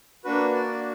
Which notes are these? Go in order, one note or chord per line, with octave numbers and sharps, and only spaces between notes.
A#3 D4 F#4 B4
D5